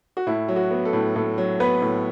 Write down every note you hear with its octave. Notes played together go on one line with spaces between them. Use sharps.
F#4
A2 E4
F#3
F#4
B3
A4
A2
A2 A4
F#3
B3 B4
A2